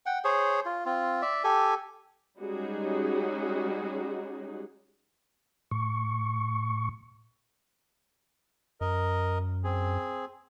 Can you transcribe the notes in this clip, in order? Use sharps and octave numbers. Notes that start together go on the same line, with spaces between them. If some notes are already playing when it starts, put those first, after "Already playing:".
F#5 G5
G#4 C5 C#5
F4
C4 F4
D5 E5
G4 A4 G#5
G3 G#3 C#4 D#4 F#4 G#4
A2 C#6
F#2 A#4 D#5
C4 G#4